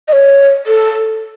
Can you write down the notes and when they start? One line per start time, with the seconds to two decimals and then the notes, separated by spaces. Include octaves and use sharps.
0.08 D#5
0.13 C#5
0.67 A4